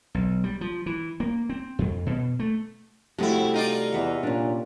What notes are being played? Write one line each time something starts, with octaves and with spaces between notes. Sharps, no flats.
B1
G3
F3
E3
A#3
C4
F2
B2
A3
C3 F3 G3 A3 E4 F#4
D#4 F4 D5
E2 D#5 E5 F#5
A#2 C#4 D4